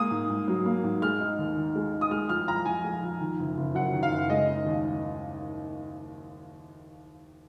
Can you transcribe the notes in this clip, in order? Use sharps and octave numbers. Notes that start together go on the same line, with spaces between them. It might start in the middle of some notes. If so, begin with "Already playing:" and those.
Already playing: G#3 A#3 D#6
G#2
G#2
F#3
A#3
G#2
G#3 F6
D#4
D#2
D#3
G#3
D#4
D#6
G#3 F6
F2 F6
F2 A#5
F3 G#5
G#3
F2
D#3
F#1
F#1
F#2 F#5
D#3
F5
F#1
G#3 D#5
D#4
D#2